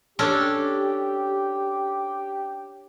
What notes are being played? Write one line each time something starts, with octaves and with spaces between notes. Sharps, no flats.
C#4 D4 G4 A4